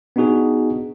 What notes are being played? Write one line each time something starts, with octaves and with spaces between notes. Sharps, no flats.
B3 D4 D#4 F#4 G#4